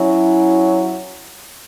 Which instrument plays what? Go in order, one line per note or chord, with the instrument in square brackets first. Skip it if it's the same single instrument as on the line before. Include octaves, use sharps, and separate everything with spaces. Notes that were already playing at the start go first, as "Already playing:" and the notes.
Already playing: [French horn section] F#3 C#4 E4